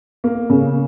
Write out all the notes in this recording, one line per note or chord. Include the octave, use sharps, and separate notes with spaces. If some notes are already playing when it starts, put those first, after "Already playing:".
A#3
C#3